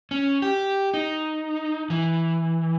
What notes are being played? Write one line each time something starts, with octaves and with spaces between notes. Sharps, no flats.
C#4
G4
D#4
E3